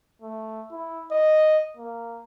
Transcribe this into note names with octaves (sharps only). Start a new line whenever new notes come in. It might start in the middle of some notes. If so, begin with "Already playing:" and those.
A3
E4
D#5
A#3